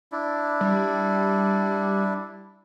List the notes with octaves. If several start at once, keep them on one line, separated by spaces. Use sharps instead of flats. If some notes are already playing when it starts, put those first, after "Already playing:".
D4 E4
G3